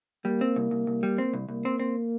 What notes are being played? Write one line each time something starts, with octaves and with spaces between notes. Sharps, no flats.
G3 A#3
C4
C2
C2
C2
G3
C4
C2
C2 A#3
C4
C4